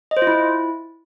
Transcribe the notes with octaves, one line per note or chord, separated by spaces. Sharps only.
D#5
C5
F4
E4